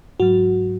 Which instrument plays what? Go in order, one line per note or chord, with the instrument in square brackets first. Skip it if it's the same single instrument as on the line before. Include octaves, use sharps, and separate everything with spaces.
[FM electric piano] G#2 F#3 F#4